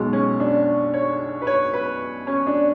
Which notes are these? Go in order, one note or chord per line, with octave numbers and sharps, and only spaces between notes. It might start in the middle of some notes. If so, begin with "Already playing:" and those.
Already playing: B1 B2 G#3
C#4
D4
C#5
B4
C#5
B4
C#4
D4